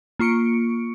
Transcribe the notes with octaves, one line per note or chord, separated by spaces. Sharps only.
A#3 F4 C#6 C#7 D7